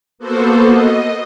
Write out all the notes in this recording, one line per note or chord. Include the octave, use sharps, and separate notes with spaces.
A#3 B3 F#4 A4 C5
D#5